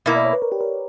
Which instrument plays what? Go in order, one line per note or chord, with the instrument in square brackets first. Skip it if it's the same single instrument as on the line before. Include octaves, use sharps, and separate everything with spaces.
[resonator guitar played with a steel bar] B2 A#3 E4 [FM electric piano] E5
[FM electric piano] D5
C#5
B4
A#4
G4
A#4